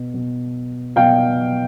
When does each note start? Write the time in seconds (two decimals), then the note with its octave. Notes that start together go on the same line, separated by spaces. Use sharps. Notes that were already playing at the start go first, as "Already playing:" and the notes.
Already playing: B2
0.14 B2
0.96 B2 F5 G5